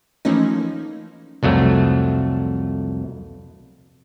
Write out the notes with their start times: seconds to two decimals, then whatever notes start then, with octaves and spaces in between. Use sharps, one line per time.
0.25 E3 F3 A3 A#3 C#4 D#4
1.43 C2 F2 F#3 A3